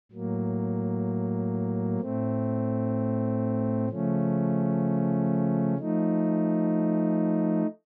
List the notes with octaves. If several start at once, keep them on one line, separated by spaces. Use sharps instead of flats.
A2 F#3 A#3
A2 A3 C4
C#3 F3 A3 C#4
F3 A3 D#4